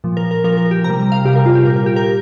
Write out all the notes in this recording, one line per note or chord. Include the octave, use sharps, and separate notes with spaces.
A#2 F3
A#4
A#4
A#2 F3 A#4
A#4
G4
C3 A#5
G3
F5
C3 G3 G4
A#4
F4
G4
A#2 G3 A#4
A#4
G4
A#4